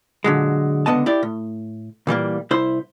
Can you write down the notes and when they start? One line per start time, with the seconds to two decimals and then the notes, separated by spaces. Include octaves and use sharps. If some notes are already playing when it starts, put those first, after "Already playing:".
0.24 A#2 D3 F#3 G#3
0.86 C#2 D3 B3 D#5 A5
1.06 E4 G4 D5
1.23 A2
2.07 A#2 E3 G3 A#3
2.51 C2 E4 C5